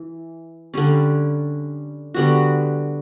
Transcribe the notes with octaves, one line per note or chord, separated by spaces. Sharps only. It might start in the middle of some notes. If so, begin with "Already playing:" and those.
Already playing: E3
D3 G3 C#4
D3 G3 B3 F#4